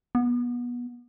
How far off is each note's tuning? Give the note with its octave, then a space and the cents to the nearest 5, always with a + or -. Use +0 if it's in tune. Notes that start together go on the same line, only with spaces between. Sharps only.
B3 -25